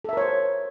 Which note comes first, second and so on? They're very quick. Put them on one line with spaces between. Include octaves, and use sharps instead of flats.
A4 E5 A#4 C#5 C5